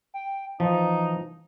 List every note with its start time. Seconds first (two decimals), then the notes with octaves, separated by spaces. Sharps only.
0.14 G5
0.60 E3 F3 D#4